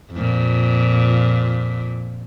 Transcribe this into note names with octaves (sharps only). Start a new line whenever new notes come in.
F2 A#2